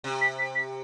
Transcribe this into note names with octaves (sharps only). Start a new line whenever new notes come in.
C3
B6
B6
B6